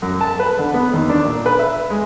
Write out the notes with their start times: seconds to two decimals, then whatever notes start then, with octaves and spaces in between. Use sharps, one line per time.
0.02 F#2
0.21 A5
0.39 B4
0.59 D3
0.74 B3
0.93 D#2
1.09 D4
1.25 A#2
1.46 B4
1.59 E5
1.90 G#3